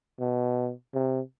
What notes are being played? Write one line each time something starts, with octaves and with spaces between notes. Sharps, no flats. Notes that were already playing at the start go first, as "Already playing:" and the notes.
B2
C3